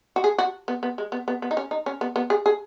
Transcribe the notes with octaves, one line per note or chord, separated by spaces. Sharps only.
F#4
G#4
F#4
B3
B3
G#3
B3
B3
B3
D#4
C#4
D#4
C#4
B3
B3
G#4
G#4